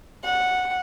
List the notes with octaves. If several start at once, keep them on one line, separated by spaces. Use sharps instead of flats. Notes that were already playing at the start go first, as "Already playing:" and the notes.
F#5